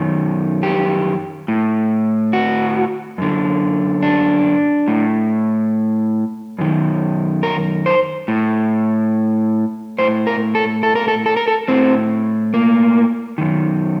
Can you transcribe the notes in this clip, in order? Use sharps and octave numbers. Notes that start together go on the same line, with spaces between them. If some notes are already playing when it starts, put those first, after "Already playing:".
Already playing: F#2 D#3
G4
A2
F#4
F#2 D3
D4
A2
F#2 D#3
A#4
C5
A2
A2 C5
A#4
A4
A4
A#4
A4
A4
A#4
A4
A2 C4
A#3
F#2 D#3